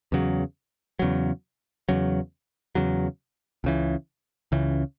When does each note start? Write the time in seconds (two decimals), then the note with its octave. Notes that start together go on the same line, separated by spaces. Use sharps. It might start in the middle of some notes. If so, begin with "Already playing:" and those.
0.12 E2 C#3 F#3
0.99 E2 C#3 F#3
1.89 E2 C#3 F#3
2.75 E2 C#3 F#3
3.64 C#2 C#3 E3
4.52 C#2 C#3 E3